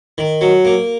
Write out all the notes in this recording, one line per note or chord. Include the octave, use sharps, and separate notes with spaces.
D#3
F#3
A#3